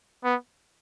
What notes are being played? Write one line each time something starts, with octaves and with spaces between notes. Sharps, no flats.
B3